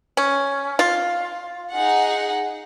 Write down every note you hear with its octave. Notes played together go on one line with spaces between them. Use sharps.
C#4
F4
D#4 G#4 F#5